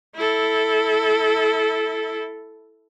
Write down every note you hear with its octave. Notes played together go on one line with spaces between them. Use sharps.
E4 A4